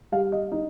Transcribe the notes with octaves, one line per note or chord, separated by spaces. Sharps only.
G3 F5
D#5
D#4 D#5